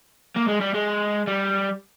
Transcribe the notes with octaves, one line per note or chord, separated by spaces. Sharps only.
A#3
G#3
G3
G#3
G3